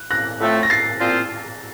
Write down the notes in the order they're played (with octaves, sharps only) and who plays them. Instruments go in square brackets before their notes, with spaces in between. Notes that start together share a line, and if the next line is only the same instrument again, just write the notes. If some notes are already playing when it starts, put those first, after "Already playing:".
Already playing: [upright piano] F#6
F#6 A#6
[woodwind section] A2 F3 A3 C4
[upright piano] A#6
A6 C7
[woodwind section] A#2 F3 C4 F4 C5